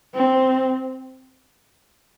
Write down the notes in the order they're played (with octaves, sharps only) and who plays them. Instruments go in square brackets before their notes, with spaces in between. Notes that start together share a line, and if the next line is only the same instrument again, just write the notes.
[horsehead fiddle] C4